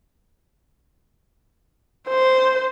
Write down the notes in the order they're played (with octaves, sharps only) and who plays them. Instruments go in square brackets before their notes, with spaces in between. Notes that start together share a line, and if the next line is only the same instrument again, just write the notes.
[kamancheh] C5